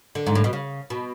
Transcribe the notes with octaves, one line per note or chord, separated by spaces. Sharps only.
D3
G#2
A2
B2
C#3
B2